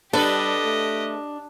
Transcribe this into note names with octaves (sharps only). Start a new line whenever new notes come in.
G3 D4 G4 A4 B4 D#5
A3